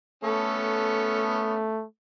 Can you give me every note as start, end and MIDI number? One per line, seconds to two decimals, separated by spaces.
0.24 1.85 57
0.24 1.70 59
0.24 1.70 61
0.24 1.70 69